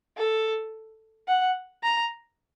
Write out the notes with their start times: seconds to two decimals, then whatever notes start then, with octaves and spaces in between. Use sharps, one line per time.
0.17 A4
1.28 F#5
1.83 A#5